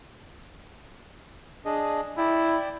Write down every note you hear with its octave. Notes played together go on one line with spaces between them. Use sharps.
D4 G#4 D#5
E4 D5 G5